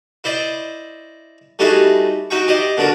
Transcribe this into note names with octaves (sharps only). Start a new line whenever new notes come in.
E4 C5 D5 D#5
G3 A3 D#4 E4 F#4 G#4
D#4 F#4 E5 G5 C#6
G4 C5 D5 D#5
B2 D3 D4 F#4 A#4